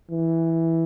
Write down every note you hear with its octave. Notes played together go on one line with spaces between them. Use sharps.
E3